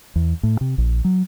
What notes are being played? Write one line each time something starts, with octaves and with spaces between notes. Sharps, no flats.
E2
A2
C3
A#1
F#3